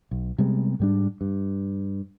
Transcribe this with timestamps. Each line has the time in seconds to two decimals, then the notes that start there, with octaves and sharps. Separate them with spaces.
0.11 B1
0.38 C3 G3 G#3 B3
0.80 G#2 G3 D4
1.21 G2